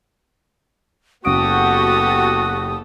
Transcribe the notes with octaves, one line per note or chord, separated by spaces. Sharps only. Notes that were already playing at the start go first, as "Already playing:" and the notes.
F#1 C#3 B3 F#4 G4 A4 D#6 D7